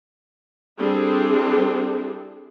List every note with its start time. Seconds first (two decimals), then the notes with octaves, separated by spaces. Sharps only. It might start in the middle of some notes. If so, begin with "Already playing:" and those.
0.79 G3 C4 D4 E4 G#4 A4